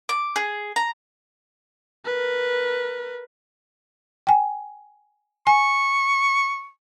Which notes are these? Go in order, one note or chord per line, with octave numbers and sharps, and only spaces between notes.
D6
G#4
A#5
A#4 B4
G5 G#5
G#5 C#6